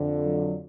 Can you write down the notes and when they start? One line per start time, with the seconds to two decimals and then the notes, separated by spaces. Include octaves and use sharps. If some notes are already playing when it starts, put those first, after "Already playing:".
Already playing: F2 D3
0.22 F#3